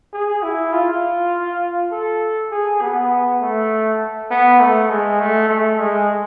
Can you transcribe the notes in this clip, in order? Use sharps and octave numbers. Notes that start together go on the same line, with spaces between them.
G#4
E4
F4
A4
G#4
B3
A3
B3
A3
G#3
A3
A3
G#3